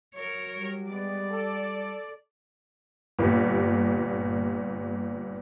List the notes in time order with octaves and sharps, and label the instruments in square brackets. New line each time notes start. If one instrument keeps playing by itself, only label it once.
[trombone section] F#3 [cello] A#4 C#5
[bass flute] G3
[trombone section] G#3 B3 [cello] D5
[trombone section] A4
[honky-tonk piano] G1 A#2 G3